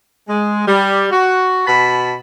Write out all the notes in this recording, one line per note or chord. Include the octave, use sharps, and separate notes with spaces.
G#3
G3
F#4
B2 A5 B5